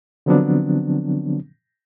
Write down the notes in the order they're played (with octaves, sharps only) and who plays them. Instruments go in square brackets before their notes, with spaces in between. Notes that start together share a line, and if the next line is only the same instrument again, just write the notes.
[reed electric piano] D3 F3 F#3 B3 C4 D4